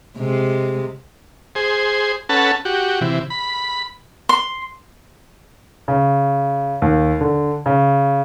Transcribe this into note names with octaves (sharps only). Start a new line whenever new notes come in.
C3 G#3
G#4 C5
C#4 A4 B4 F#5 A5
F#4 G4
C3 E3
B5
C6
C#3
D#2
D3
C#3